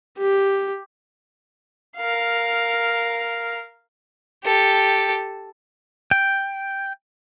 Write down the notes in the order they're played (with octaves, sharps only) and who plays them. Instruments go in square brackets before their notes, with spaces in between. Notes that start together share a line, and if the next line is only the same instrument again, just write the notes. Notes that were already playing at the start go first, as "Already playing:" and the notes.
[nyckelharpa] G4
[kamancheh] A#4 F5
[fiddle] G4 A4
[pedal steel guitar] G5